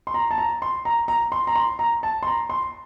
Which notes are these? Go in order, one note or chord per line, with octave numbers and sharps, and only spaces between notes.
C6
A#5
A5
A#5
C6
A#5
A#5
C6
A#5
C6
A#5
A5
C6
A#5
C6